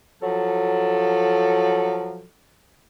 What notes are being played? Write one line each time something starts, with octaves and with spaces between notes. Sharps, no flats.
F3 F#3 A4